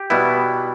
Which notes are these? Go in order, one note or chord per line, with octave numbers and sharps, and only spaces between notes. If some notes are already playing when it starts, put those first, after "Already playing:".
Already playing: G4
B2 G3 B3 E4